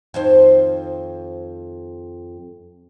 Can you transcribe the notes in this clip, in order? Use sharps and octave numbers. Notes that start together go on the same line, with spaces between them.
F2 D#3 C5